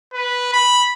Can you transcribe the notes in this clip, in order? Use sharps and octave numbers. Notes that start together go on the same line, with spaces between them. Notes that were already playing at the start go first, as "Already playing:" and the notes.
B4
B5